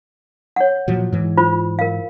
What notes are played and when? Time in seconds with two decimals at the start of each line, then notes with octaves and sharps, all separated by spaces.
0.56 C#5 F#5
0.88 A#2 F3 F#3
1.13 G#2 E3
1.37 F4 C5 B5
1.79 A#4 F5